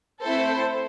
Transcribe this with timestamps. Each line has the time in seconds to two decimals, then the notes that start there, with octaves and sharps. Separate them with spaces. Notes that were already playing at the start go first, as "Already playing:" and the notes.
0.22 A3 C4 E4 A4 C5